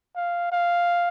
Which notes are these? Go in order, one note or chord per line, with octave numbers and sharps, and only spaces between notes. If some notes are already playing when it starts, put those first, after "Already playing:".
F5
F5